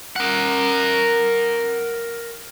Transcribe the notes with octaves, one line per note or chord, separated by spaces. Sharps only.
A#4 F#5